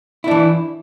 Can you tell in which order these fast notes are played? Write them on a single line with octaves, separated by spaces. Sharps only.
E4 D4 E3